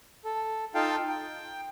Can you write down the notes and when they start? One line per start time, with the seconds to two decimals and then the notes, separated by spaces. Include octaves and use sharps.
0.25 A4
0.75 D#4 F4 A4 F5 G5 A5
1.09 G5